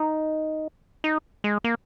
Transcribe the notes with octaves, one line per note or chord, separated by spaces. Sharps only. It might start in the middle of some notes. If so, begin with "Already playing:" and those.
Already playing: D#4
D#4
G#3
A#3